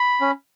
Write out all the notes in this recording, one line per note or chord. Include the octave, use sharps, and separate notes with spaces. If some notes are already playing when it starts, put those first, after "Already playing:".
Already playing: B5
C#4